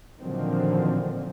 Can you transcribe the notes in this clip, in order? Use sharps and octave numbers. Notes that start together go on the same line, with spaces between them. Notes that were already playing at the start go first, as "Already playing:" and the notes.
A#2 D3 D#3 F3 F#3 C4